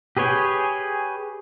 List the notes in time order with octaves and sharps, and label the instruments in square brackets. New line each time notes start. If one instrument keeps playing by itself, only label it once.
[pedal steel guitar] G4 G#4 B4 C#5 G5